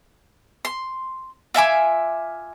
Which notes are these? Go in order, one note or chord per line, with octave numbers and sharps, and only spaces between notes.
C6
F4 E5 G#5 D6